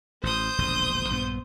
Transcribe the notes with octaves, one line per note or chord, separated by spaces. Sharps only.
A1 C5 D#6 G6
E1 A#1 D3
A#1 G2 B3